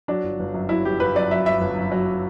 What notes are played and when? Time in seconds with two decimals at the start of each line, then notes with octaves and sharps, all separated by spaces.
0.08 F#3 D4
0.23 G1
0.40 G1
0.54 F#2
0.69 F#3 E4
0.85 G1 G4
1.00 G1 B4
1.15 F#2 D5
1.31 F#3 E5
1.46 G1 E5
1.61 G1
1.76 F#2
1.92 F#3